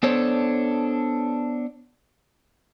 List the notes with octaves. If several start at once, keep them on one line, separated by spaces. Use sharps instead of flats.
B3 D4 A4 C5 C#5